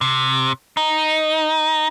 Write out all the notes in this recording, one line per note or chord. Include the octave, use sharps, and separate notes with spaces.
C3
D#4